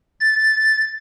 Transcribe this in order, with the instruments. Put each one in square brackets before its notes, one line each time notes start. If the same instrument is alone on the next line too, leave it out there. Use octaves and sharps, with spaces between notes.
[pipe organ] A6